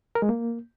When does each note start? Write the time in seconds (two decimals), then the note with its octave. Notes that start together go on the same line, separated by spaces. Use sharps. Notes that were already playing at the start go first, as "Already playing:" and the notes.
0.15 A#4
0.22 G#3
0.29 A#3